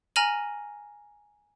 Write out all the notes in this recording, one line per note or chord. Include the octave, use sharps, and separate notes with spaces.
G#5 A#5 F6 A#6 D#7 F#7